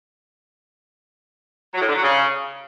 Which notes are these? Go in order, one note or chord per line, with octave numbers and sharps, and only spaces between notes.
F#3
A2
D3
F#3
C#3